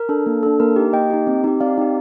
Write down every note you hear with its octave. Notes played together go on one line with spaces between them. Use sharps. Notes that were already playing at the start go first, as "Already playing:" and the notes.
Already playing: A#4
D4 A4
A#3
D4 A4
A#3 A#4
D#4 G4
A#3 D#5 G5
D#4 G4
C4
D#4 G4
C4 D5 F5
D#4 G4